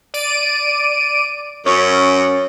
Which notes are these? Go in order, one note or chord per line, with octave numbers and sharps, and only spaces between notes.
D5 D7 D#7
F#2 C#4 C#5 C#6